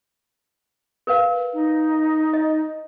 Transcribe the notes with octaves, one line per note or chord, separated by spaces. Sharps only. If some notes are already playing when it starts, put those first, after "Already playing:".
A#4 B4 F5
D#4
D#5